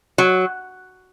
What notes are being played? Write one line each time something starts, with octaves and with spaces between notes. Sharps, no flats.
F#3